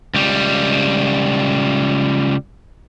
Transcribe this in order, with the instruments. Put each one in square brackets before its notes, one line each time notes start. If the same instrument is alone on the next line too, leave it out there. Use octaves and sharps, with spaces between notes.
[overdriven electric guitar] C#2 G3